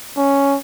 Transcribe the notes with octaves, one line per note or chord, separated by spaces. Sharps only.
C#4